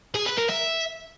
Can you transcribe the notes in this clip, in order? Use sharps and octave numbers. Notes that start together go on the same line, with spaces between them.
G#4
B4
A#4
E5